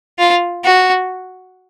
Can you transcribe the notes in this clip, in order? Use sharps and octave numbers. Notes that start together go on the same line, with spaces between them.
F4
F#4